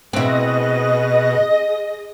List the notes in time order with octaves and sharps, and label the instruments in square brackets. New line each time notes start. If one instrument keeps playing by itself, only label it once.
[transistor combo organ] B2 [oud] C4 E4 [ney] G#4 [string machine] D#5 A#6